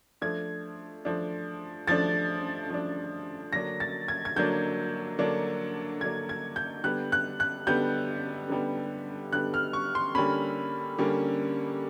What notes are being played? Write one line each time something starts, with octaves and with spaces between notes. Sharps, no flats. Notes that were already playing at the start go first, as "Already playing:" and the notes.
F3 A3 D4 G#6
F3 A3 D4
F3 A3 D4 A6
F3 A3 D4
D3 F#3 A#3 D4 A#6
A6
G#6
G#6
D3 F#3 A#3 D4 G6
D3 F#3 A#3 D4
D3 F#3 A#3 D4 G#6
G#6
G6
D3 G3 B3 F#6
F#6
F#6
D3 G3 B3 G6
D3 G3 B3
D3 G3 B3 F#6
F6
C#6
C6
D3 G3 A#3 C#4 B5
D3 G3 A#3 C#4